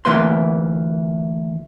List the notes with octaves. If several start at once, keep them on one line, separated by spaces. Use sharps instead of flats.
D2 C3 E3 A#3 B4 C6